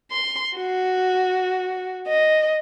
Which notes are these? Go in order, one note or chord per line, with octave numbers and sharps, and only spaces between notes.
C6
F#4
D#5